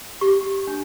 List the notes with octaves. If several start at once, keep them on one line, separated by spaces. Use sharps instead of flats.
G4 C#6
D4